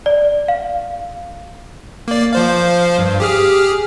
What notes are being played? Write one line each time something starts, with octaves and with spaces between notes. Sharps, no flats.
D5
F5
A#3 D5
F3 C5 F5
G2
G4 G#4 F6